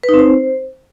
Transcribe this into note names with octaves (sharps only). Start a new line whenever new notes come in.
B4
D#4
C4
C5